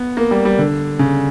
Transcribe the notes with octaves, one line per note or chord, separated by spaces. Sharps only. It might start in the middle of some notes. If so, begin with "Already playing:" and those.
Already playing: B3
A#3
G3
G3
D3
C#3